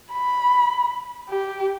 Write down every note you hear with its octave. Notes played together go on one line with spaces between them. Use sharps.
B5
G4